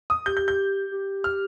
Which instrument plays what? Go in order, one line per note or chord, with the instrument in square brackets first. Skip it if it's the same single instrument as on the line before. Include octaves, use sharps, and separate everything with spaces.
[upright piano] D#6
[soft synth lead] G4 [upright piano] G6
[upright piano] G6
G6
[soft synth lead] G4
[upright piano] F6